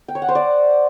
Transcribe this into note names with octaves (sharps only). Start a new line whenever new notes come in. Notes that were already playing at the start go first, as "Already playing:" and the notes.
G5
C#5
F#5
C5
D5